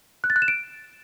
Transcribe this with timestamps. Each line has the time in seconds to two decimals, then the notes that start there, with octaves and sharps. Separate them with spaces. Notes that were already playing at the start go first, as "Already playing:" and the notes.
0.24 F#6
0.30 A6
0.36 F#6
0.42 E7
0.48 D7